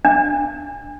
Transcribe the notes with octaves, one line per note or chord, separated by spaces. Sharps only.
D4